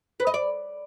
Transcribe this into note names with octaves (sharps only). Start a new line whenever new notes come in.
B4
D#5
D5